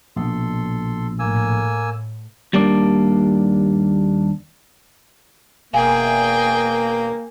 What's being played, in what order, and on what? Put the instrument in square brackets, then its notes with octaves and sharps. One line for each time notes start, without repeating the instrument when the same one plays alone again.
[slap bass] A#1 B2 [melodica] A4 C6
[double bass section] A2 [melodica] A#3 G#5 E6
[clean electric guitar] D#2 G3 A#3 D4 D5
[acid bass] E1 [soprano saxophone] A#3 [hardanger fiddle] G#4 G5 [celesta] F5 G#5